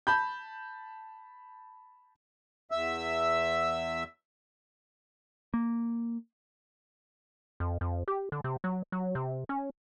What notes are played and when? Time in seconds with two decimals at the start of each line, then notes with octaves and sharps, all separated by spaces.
0.07 A5 B5 G6
2.71 E2 E5 E6
5.54 A#3
7.60 F2
7.81 F2
8.08 G4
8.32 D3
8.44 C3
8.64 F#3
8.92 F#3
9.15 C3
9.49 C#4